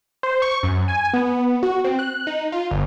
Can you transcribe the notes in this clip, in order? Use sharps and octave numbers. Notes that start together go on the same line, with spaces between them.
C5
C#6
F#2
G#5
B3
F#4
C4
F#6
D#4
F4
G1